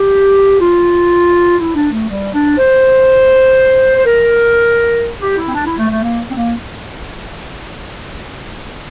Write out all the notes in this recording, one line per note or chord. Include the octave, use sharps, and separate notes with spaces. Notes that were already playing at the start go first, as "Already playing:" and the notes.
Already playing: G4
F4
E4
D4
A3
G3
D4
C5
C5
A#4
G4
E4
C4
D4
E4
A3
A3
A#3
C4
A#3